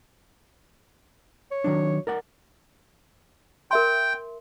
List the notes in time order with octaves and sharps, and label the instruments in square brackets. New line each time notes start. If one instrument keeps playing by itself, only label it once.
[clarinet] C#5
[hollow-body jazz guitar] D#3 F#3 D4
A#4 D5 F#5
[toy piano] A#4 E5 C6 [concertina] G5